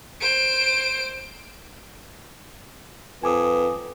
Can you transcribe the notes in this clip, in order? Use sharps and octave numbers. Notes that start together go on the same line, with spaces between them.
C5 D7
F2 B4 G#5 D6 D#6